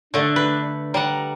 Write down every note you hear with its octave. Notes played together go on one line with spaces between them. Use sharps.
D3 A3 D4
B4
G3 F#5 A#5